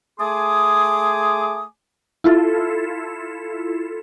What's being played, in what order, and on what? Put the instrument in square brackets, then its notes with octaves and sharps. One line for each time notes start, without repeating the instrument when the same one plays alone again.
[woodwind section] A3 G#4 G#5 C6 D6 D#6
[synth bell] E4 F4 A4